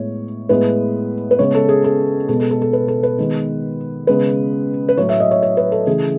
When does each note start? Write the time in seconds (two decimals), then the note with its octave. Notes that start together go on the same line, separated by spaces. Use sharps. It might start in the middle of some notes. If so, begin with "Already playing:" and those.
Already playing: A2 G#3 B3 C#5
0.49 A2 G#3 B3 B4
1.31 B4
1.39 C#3 G#3 B3 C#5
1.55 A4
1.69 G#4
1.84 A4
2.28 B2 G#3 B3 A4
2.40 A4
2.51 A4
2.62 A4
2.73 B4
2.88 A4
3.03 B4
3.18 D#3 G#3 B3
4.07 C#3 G#3 B3 B4
4.89 B4
4.97 A2 F#3 A3 C#5
5.09 E5
5.20 D#5
5.31 C#5
5.42 C#5
5.57 B4
5.72 A4
5.87 C#3 E3 A3 G#4